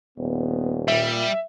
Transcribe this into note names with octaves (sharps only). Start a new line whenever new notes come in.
D#1 B3
A#2 G3 E5